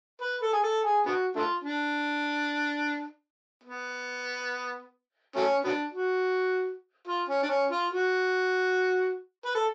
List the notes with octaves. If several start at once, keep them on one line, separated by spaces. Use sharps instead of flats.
B4
A4
G#4
A4
G#4
B3 D4 F#4
A3 D4 F4
D4
B3
F#3 A3 C#4
F#3 B3 D4
F#4
F4
C#4
D4
C#4
F4
F#4
B4
A4